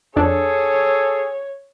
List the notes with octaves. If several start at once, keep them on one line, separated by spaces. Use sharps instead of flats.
F2 D4 G#4 A4 C#5